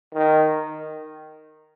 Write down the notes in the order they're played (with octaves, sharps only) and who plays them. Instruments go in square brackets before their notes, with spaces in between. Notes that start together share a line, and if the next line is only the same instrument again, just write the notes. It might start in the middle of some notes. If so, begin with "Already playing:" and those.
[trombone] D#3